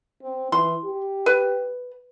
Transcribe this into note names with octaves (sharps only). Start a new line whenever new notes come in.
C4
E3 C6
G4
B4